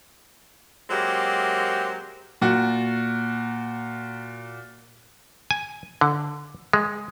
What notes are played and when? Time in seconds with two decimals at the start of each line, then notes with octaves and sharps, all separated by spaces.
0.90 F#3 G#3 A#3 C4 F#4 G4
2.41 A#2 F#4
5.51 G#5
6.01 D3
6.73 G#3